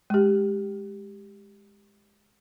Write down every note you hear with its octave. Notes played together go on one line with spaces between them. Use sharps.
G#3 G4